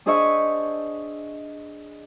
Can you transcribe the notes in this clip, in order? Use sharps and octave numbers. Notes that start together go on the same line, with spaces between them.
D4 G#4 C5 D#5 E5 C#6